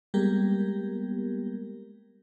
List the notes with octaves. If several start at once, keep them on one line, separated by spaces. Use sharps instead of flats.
G3 G#3 A#3 B3 G4 A#4